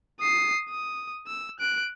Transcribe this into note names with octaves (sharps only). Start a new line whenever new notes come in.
D#6 C7
D#6
E6
F#6 D7